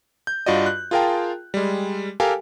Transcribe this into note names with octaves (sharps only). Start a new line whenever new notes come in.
G6
G2 F4 F#4 D5 D#5
F#6
F4 G#4 A#4 F5 G5 A5
G3 G#3
G4 A4 A#4 F5 G5 G#5